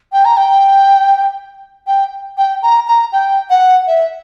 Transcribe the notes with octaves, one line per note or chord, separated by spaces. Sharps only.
G5
A#5
G5
G5
G5
A#5
A#5
G5
F#5
E5